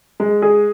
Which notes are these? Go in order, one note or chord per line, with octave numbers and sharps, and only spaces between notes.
G#3
G#4